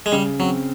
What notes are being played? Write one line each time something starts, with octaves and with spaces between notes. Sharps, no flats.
G#3
C#3 G3
F#3 C4